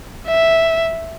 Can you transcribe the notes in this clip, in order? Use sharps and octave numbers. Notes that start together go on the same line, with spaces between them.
E5